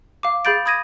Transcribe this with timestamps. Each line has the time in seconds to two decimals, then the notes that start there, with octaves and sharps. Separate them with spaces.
0.23 F5 D6
0.45 G#4 F5 B5 G6 A6 D7
0.66 B5 D#6 G#6 A#6 D#7